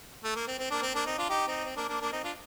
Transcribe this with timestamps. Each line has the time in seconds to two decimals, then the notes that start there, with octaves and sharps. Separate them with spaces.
0.24 A3
0.36 A#3
0.48 C4
0.59 C4
0.71 A#3 D4
0.82 C4
0.94 A#3 D4
1.06 C4 D#4
1.18 D4 F4
1.30 D#4 G4
1.47 C4 D#4
1.65 C4
1.77 A#3 D4
1.89 A#3 D4
2.01 A#3 D4
2.13 C4 D#4
2.24 D4 F4